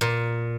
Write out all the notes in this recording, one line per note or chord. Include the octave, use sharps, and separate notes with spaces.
A#2